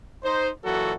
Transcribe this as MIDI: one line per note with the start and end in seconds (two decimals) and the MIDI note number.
0.25 0.49 63
0.25 0.49 72
0.64 0.93 46
0.64 0.93 52
0.64 0.93 54
0.64 0.93 66
0.64 0.93 69